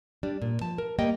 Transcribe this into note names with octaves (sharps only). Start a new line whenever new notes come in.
G3 D4
A#2
F3 A5
A#4
G3 A#3 D#5 G5